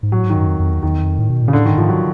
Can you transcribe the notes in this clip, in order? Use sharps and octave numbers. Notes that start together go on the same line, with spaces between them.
G#2
A2 F#3
G#2
D#3
F#2
F2
F2
E2
E2 D#3
F2
A2
B2
A#2
C#3
A2 D3
G#2 D#3
G#2 F3
F#3